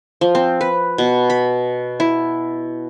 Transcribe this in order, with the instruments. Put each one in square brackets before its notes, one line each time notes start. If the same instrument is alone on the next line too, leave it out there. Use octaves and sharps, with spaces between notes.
[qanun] F3
C4
B4
B2
B5
E4